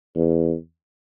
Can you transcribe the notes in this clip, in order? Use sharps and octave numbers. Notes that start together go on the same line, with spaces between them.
E2